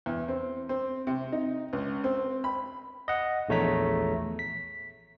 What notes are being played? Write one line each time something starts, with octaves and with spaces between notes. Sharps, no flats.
E2
C4
C4
C3
D#4
C#2
C4
B5
D#5 F#5
A#1 E2 A3 C#5 A#5 B6
B6